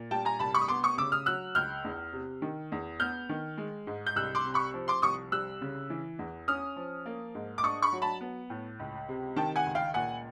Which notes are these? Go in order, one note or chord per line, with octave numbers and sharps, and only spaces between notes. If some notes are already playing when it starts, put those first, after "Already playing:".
Already playing: A#2
G3 G5 A5
G#5 A#5
C2 A5 B5
B5 C#6
D#6
B3 C6 D6
C#6 D#6
C#3 D6 E6
D#6 F6
F#3 E6 F#6
C#2 F6 G6
E2
C3
D#3
E2
B3 F6 G6
D#3
G#3
G#2
G6
C2 E6 F#6
C6 D6
C3
B5 C#6
F3
C6 D6
C2 C#6 D#6
G3 E6 F#6
C#3
E3
E2
C#4 D#6 F6
F3
A#3
G#2
D6
D4 C#6 D#6
B5 C#6
F#3
A5 B5
B3
A2
C#2
C3
D#3 G5 A5
F#5 G#5
C#2
F5 G5
A#2 F#5 G#5